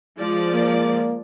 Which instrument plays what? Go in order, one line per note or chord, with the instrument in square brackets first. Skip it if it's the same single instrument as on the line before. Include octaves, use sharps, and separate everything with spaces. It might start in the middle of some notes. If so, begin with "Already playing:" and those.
[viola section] F3 G#3 D5
[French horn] A#3